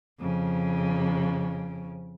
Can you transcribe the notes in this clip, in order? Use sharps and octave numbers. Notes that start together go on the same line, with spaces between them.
F2 C#3